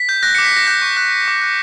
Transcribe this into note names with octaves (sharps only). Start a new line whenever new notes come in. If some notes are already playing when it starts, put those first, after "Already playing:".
Already playing: B6
G6
F#6 A#6
D6 C#7
B6
F#6 A#6
F#6 G6
C#6
F#6
F#6
D6
F#6